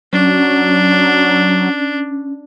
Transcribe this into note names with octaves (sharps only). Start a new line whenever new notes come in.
F#3 C#4 D4